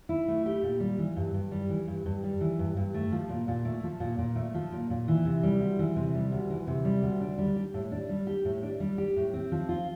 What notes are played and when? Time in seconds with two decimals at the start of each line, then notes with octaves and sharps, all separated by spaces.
0.09 E4
0.28 A3
0.46 G4
0.63 A#2
0.80 G3
0.98 E3
1.16 G2
1.34 G2
1.52 G3
1.69 E3
1.88 G2
2.06 G2
2.24 G3
2.41 E3
2.59 G2
2.77 G2
2.94 A3
3.12 F3
3.29 A#2
3.48 A#2
3.65 A3
3.83 F3
4.00 A#2
4.18 A#2
4.36 A3
4.54 F3
4.72 A#2
4.90 A#2
5.08 E3
5.25 C3
5.43 G3
5.60 D2
5.79 E3
5.96 C3
6.15 G3
6.32 D2
6.50 E3
6.67 C3
6.85 G3
7.03 D2
7.21 D4
7.38 G3
7.56 G4
7.74 A2
7.91 D4
8.09 G3
8.27 G4
8.45 A2
8.63 D4
8.80 G3
8.98 G4
9.16 A2
9.34 C4
9.52 F3
9.69 F4